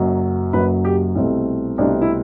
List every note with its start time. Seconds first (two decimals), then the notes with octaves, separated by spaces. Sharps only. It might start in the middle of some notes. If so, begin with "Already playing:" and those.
Already playing: F#1 F#2 F#3
0.53 F#1 F#2 F#3 B4
0.85 G4
1.15 C2 B2 A3 C4
1.78 C2 B2 A3 C4 D4
2.01 E4